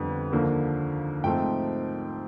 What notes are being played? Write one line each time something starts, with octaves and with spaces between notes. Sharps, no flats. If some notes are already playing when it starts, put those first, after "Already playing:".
Already playing: F2 D3 G3 B3
D#2 D3 F3 A#3
G#2 F3 A3 C4 G5